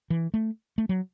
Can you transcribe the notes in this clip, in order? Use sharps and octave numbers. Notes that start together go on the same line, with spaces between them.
E3
A3
A3
F#3